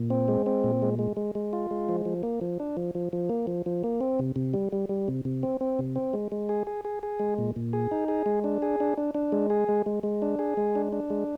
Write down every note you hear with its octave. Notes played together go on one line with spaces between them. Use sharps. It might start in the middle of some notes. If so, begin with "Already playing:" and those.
Already playing: A#2
C4
G#3
C4
A#2
G#3
G#3
G#3
G#3
F4
G#3
F3
F3
A#3
F3
D4
F3
F3
F3
A#3
F3
F3
A#3
C4
C3
C3
G3
G3
G3
C3
C3
C4
C4
C3
C4
G#3
G#3
G#4
G#4
G#4
G#4
G#3
A#2
A#2
G#4
D#4
G#4
G#3
D4
G#4
D4
D4
D4
G#3
G#4
G#3
G#3
G#3
D4
G#4
G#3
D4
D4
G#3